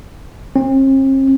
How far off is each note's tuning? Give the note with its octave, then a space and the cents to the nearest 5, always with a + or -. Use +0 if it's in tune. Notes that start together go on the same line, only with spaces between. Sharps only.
C4 +45